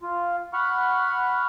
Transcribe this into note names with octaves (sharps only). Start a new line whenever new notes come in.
F4
F#5 B5 C#6 F6